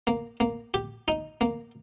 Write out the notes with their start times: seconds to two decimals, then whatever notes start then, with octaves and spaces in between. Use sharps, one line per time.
0.07 A#3
0.40 A#3
0.74 G4
1.08 D#4
1.41 A#3